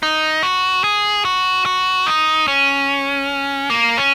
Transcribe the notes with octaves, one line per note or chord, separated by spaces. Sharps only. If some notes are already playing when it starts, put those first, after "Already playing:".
D#4
F#4
G#4
F#4
F#4
D#4
C#4
A#3
C#4